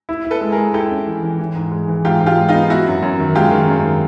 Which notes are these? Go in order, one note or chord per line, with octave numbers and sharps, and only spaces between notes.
E4
E4
A4 B4
G#3
G#4 A#4
G#3
E4 G4 A4
C#4
E3
E3
E3
G#2
G#3
E3
G#2 F4 G4
G#2
F4 G4
G#3
D#4 F4
B3
B3 E4 F#4
F#2
F#2
D#3
G#3 F4 G4
D#3
F#2
D#3